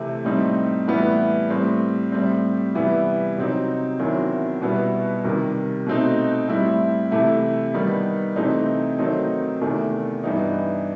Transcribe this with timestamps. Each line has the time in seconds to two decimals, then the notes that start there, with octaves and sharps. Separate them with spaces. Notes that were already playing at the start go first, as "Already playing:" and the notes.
Already playing: C3 E3 A3 C4
0.25 A2 G3 C4 D#4
0.87 A2 E3 G3 B3 E4
1.50 A2 G3 C4
2.12 A2 G3 C4
2.75 C3 E3 G3 B3 E4
3.37 C3 F#3 C4 D#4
3.99 E2 D#3 F#3 C4 E4
4.62 B2 G3 B3 E4
5.24 C3 D#3 G3
5.87 B2 A3 C4 D#4
6.48 A2 G3 C4 E4
7.11 C3 E3 A3 E4
7.74 D#3 G3 B3 D#4
8.36 C3 E3 A3 C4 D#4
8.99 D#3 F#3 A3 C4 D#4
9.61 E2 C3 D#3 A3
10.24 G2 E3 B3 D#4